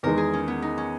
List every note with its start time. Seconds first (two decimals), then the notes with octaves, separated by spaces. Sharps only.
0.03 E2 D#3 G#3 A#4
0.17 G#4
0.33 C#4
0.48 B3
0.62 D#4
0.78 C#4